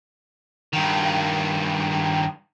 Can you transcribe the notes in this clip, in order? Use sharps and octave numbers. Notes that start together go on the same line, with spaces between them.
G2 D#3